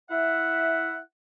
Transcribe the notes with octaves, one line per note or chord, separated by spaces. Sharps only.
E4 E5 F#5